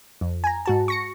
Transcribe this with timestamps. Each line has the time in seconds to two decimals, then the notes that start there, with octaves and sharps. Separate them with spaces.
0.21 F2
0.44 G#5 A#5
0.66 G#2 F#4 A5
0.88 C#6 A#6 C#7